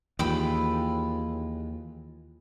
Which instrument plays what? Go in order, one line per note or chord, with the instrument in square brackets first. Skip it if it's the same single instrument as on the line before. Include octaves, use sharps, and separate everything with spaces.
[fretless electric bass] D#2 [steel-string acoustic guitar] E3 G#3 F4 [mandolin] G5 B5 E6